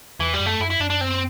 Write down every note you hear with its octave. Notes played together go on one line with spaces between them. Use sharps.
E2 E3
G3
F#2
A3
F#2 E4
E4
F#2 D4
D4
C4